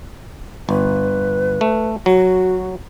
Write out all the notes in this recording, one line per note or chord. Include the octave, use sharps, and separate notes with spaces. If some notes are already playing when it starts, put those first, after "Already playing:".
G1 B4
A3
F#3 F#4